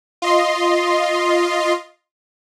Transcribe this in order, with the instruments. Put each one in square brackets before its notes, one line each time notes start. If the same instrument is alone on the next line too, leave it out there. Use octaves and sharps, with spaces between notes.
[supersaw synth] F4 D#5 C6